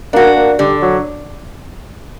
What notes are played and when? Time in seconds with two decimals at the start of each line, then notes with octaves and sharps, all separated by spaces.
0.13 A#3 D4 F#4
0.36 A#3
0.59 D3 G3
0.82 F#3